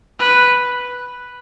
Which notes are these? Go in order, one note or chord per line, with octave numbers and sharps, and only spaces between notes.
B4